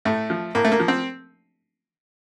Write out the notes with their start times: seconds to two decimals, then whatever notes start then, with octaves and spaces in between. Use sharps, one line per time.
0.05 A2 A3
0.30 F3
0.55 A2 A#3
0.65 A3
0.72 A#3
0.80 F3
0.88 C4